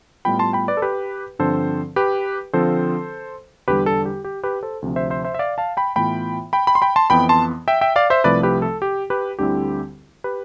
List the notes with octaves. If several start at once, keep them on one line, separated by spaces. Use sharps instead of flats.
A2 G3 B3 F4 G5 B5
A5 C6
G5 B5
B4 D5
A4
G4 B4
G2 D3 F3 C4 A4 C5
G4 B4
D3 F3 C4 F4 A4 C5
E2 D3 G3 G4 B4
A4
G4
G4
G4 B4
A4 C5
D2 C3 F3
C5 E5
C5 E5
C5 E5
E5
D5 F5
F5 A5
G5 B5
A2 E3 B3 F4 G5 B5
G5 B5
G5 B5
C6
G5 B5
A5 C6
F2 E3 B3 G5 B5
A5 C6
E5 G5
E5 G5
D5 F5
C5 E5
C2 C3 F3 A3 E4 B4 D5
G4 B4
A4
G4
G4 B4
D2 D3 G3 C4 E4 G4
G4 B4